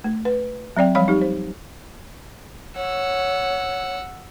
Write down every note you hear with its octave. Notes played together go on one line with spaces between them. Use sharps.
A3
B4
F#3 C4 D5 G5
F3 G3 C#5 F5 B5
D#4 G4
C5
C#5 F#5 E6